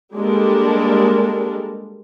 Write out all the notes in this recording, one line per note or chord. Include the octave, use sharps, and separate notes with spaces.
G3 G#3 A#3 D4 A4 A#4